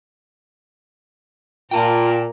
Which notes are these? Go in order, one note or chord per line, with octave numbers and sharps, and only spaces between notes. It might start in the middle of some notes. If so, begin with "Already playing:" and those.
A#2 A#3 F4 G5 A5 A#5